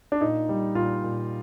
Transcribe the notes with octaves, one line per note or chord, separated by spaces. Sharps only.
D4
A#2 D#4
G3
A#2 F4
A#2